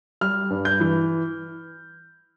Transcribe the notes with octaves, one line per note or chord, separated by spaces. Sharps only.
G3 F6
G2
G6
E3